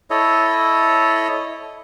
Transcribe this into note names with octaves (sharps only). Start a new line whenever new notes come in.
E4 A4 C#5 D#5